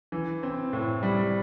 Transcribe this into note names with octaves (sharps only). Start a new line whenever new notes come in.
E3
C4
A2
G3